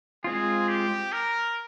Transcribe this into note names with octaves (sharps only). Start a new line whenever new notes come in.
G#3 C4 F4 G#4
G4
A#4